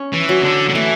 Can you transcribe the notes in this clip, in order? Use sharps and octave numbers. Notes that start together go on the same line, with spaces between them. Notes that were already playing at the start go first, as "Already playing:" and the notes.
Already playing: C#4
E3
F#3
D3
D3
E3 A3